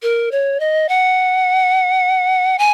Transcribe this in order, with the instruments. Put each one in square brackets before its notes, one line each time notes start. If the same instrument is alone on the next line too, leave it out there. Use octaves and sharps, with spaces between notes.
[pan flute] A#4
C#5
D#5
F#5
G#5